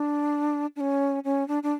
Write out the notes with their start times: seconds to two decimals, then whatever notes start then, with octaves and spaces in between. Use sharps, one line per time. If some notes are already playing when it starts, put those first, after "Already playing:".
Already playing: D4
0.76 D4
0.80 C#4
1.24 C#4
1.48 D4
1.63 D4